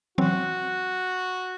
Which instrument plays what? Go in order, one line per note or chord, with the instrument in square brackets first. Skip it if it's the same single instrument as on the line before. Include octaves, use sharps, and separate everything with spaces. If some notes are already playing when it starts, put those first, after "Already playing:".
[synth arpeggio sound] E3 F#3 C4 [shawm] F#4